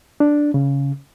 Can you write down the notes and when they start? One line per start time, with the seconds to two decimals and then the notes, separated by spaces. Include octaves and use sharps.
0.20 D4
0.54 C#3